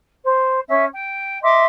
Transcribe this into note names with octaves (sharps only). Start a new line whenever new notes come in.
C5
C#4 E5
G5
D#5 E5 C6 D6